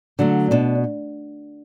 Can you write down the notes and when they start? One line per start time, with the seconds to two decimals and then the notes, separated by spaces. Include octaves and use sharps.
0.19 D3 F#3 A3
0.51 B2 D4